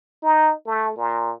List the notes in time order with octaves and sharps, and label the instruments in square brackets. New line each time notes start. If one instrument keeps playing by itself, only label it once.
[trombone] D#4
A3
A#2